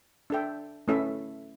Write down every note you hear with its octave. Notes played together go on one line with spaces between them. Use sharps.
D4 A4 E5 G5
A3 C#4 E4 A4 E5